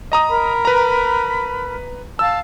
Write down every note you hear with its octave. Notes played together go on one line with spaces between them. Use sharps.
D#5 A#5 D#6
A#4 B5
B4 A#5
F5 A5 E6